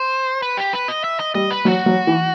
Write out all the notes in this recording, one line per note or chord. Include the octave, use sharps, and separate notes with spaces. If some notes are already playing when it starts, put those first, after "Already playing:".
Already playing: C5
B4
G4
B4
D#5
E5
D#5
G3 D#5
B4
F#3 F#4
F#3
E3